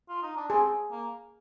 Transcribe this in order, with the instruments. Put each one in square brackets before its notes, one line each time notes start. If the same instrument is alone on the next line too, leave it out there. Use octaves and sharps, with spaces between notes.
[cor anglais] F4
D#4
D4
[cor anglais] C4 [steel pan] G#4
[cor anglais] A#3